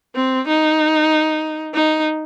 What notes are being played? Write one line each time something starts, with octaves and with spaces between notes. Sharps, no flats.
C4
D#4
D#4